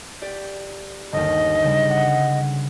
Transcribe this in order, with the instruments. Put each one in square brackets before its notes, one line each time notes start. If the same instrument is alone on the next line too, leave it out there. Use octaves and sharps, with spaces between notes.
[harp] G4 D5 B6
[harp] G1 D#2 [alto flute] D#5
[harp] C#3 G3
F#5